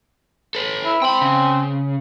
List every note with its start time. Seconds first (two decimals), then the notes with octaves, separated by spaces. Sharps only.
0.55 A4 B4
0.85 E4
1.02 C4 G5 B5
1.21 C#3